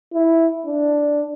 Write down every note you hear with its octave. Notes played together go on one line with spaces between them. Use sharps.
E4
D4